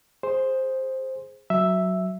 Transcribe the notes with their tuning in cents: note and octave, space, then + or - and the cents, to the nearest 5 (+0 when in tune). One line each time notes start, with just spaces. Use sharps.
G#4 +0 C5 +5
F#3 +0 E5 +0